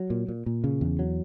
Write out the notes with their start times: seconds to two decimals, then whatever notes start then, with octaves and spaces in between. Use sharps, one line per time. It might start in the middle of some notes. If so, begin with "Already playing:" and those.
Already playing: F#3
0.10 A#2
0.28 A#2
0.46 A#2
0.64 C#3
0.81 E2
0.99 F#3